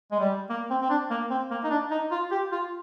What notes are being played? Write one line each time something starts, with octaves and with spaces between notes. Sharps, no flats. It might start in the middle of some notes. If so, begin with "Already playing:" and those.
G#3
G3
A#3
C4
C4
D4
A#3
C4
A#3
D#4
D4
D#4
F4
G4
F4